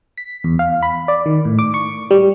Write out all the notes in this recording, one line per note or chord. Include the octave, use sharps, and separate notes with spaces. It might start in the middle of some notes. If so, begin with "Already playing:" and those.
B6
E2
F5
B5
D5
D#3
A2
D6
C#6
G3